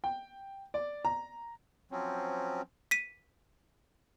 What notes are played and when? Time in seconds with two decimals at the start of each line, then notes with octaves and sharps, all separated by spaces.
0.04 G5
0.74 D5
1.05 A#5
1.91 F3 F#3 C4 C#4
2.91 B6 D#7